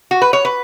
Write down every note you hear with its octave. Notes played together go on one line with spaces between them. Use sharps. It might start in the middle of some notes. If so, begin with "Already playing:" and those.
F#4
B4
C#5
B4